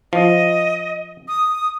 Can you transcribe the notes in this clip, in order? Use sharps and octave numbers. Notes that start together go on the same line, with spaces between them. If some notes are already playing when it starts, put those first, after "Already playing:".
F3 D#5
D#6